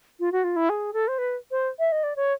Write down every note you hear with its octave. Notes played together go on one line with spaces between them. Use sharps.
F4
F#4
F4
E4
G#4
A4
C5
B4
C5
E5
D#5
D5
C#5